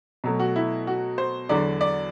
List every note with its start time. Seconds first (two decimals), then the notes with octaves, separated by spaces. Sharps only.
0.24 B2 F#3 A3
0.39 F#4
0.56 E4
0.87 F#4
1.18 C5
1.49 E2 D3 F#3 D5
1.81 D5